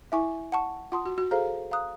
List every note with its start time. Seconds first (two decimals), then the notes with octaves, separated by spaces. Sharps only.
0.12 E4 E5 G#5 C#6
0.52 F#5 A5 C#6
0.92 F4 F#5 A5 C6 D#6
1.06 F#4
1.18 F#4
1.31 G#4 A4 C5 F5 A#5
1.71 F5 A#5 D#6 F#6